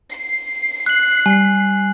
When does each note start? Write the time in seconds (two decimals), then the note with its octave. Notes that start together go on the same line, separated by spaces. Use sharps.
0.11 C7
0.86 F#6 F#7
1.26 G3 G#5